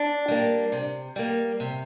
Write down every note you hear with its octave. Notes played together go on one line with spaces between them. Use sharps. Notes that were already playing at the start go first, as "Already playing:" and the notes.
Already playing: D4
G3 A#3
C3
G3 A#3
C3